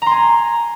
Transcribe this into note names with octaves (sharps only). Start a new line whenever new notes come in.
G#5 A#5 C6